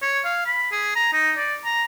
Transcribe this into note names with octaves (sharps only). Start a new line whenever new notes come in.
C#5
F5
B5
G#4
A#5
D#4
D5
A#5